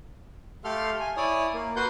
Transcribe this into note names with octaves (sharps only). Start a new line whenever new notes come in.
A3 G4 A4 F5 C6 F6
G#5
E4 C#5 D5 G#5 D#6
A#3
A#3 F#4 B4 F#5 C6 G6